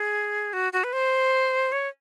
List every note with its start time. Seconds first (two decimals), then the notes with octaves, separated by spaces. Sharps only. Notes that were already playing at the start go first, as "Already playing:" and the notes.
Already playing: G#4
0.53 F#4
0.73 F#4
0.84 B4
0.93 C5
1.72 C#5